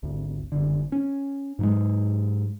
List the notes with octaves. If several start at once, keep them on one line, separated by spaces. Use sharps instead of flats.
G#1 D2
F#1 B1 D3
C#4
G#2 F#3 G#3